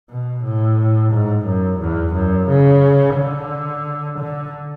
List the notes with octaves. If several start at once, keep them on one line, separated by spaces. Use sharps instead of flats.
B2
A2
G#2
F#2
E2
F#2
C#3
D3
D3